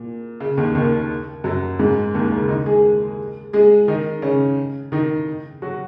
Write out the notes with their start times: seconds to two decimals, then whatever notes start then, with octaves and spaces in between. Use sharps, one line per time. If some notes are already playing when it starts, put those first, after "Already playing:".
Already playing: A#2
0.40 C#3
0.57 D#2 D#3
0.75 D#2 D#3
1.44 F#2 F#3
1.79 G#2 G#3
2.14 D#2 D#3
2.31 C#3
2.48 D#3 D#4
2.66 G#3 G#4
3.53 G#3 G#4
3.88 D#3 D#4
4.22 C#3 C#4
4.92 D#3 D#4
5.62 F#3 F#4